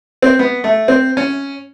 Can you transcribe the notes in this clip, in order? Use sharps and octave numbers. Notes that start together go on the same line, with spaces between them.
C4
B3
A3
C4
C#4